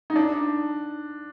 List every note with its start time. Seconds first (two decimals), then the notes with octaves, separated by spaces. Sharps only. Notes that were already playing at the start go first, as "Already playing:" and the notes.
0.10 D#4
0.16 D4